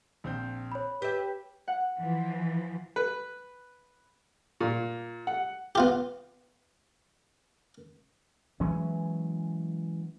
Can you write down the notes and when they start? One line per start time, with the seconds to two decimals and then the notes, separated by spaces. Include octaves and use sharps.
0.24 A#1 C4 G6
0.72 C#5 B5
1.02 G4 B4 E5 G6
1.68 F#5
1.98 E3 F3
2.96 B4
4.60 A#2
5.27 F#5
5.75 B3 F4 G4
8.60 E3 F#3 G#3 C#4